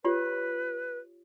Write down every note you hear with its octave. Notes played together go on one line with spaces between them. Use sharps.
F4 G4 B4 C#5